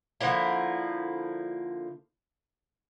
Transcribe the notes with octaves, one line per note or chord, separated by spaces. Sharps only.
D3 F3 A#3 E4